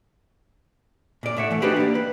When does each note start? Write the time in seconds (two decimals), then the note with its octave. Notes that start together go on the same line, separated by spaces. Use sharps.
1.23 A#2 D5
1.37 A2 E5 F#5
1.50 E3 A3
1.62 D4 D#4 F#4 G4 B4 C5
1.76 A#3 D5
1.95 B4